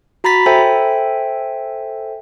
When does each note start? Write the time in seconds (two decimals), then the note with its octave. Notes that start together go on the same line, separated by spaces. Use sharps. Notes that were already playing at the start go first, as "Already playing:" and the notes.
0.24 F#4 A#5 B5 A6 B6
0.46 A4 C5 E5 G5 G#5